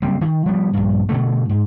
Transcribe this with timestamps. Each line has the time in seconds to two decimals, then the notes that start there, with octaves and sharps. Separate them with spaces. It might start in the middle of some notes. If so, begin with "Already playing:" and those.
0.02 F#1 G3 C4
0.21 D#3
0.46 F3 G3 B3
0.73 A#1 G2
1.09 B2 D3 A3
1.49 G#2